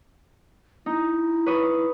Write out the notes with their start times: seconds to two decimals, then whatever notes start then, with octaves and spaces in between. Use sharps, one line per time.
0.86 D#4 E4
1.46 B4 C#5 D#6